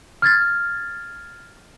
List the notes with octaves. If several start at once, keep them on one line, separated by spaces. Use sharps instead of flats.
F6 G#6 A6